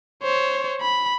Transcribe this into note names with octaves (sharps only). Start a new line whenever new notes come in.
C5 C#5
B5